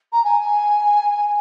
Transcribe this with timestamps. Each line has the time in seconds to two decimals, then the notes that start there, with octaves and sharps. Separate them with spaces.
0.12 A#5
0.24 G#5